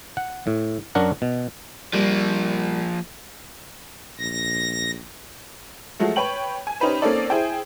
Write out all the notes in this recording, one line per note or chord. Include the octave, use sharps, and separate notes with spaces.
F#5
A2
F#2 F#3 D4 A#4 F#5
B2
F3 G3 A#3
A#1 A#6
F3 F#3 G#3 A3
B4 C#5 G5 F#7
G#5
C#4 D#4 G4 B4 C5
A#3 C4 C#4 D#4 A4 D5
E4 G#4 C5 G5